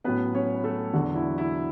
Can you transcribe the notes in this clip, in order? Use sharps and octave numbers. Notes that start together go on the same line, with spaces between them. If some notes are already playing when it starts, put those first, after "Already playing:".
A2 F#3 B3 C#4 B4
C#4 C#5
B4
A3 A4
E2 D3 F#3 F#4
E4
E4